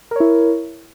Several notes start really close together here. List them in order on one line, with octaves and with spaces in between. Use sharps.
A#4 C#5 E4